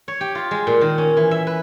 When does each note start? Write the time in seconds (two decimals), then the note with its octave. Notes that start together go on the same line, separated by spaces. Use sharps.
0.08 C#5
0.21 G4
0.35 F4
0.51 G#3
0.67 A#2
0.81 D#3
0.98 C#4
1.17 E3
1.31 E5
1.47 B4